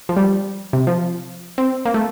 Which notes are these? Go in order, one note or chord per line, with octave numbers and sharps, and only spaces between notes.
F3
G3
C3
F3
C4
A#3
A3